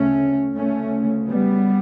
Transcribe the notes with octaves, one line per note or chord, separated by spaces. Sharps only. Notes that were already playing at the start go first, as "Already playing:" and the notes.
Already playing: D2 C#3 A3 C#4
D2 C#3 A3 C#4
G3 B3